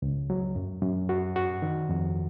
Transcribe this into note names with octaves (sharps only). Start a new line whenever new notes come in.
C#2
F#3
F#2
F#2
F#4
F#4
D#3
F2